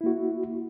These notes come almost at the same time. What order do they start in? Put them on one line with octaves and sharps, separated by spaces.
E4 A#3 F#4